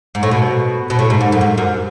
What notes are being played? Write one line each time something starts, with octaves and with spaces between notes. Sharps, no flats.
G#2
A2
B2
B2
A2
G#2
G#2
F#2
G#2
F#2